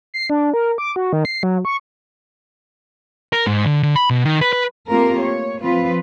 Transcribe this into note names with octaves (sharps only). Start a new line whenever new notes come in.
C7
D4
A#4
D6
F#4
D#3
C7
F#3
C#6
A#4
G#2
D3
D3
B5
B2
D#3
B4
B4
A3 A#3 C4 F4 G4 A#4
C#5
F3 C4 F4 B4